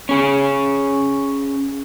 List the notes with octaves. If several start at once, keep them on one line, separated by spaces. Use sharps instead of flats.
C#4 G#4